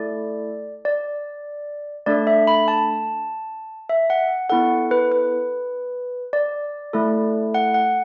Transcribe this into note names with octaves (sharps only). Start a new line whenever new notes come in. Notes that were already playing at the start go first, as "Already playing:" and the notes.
Already playing: A3 E4 A4 D5
D5
A3 D4 A4 D5
E5
B5
A5
E5
F#5
B3 E4 A4 F#5
B4
B4
D5
A3 E4 A4
F#5
F#5